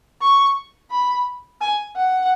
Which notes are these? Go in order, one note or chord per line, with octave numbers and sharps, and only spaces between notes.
C#6
B5
G#5
F#5